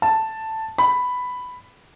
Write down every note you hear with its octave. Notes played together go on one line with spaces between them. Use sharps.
A5
B5